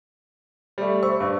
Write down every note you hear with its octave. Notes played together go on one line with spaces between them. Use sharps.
G3 A3
C5 C#6 E6
G2